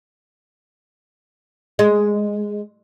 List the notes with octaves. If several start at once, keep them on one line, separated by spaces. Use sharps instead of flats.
G#3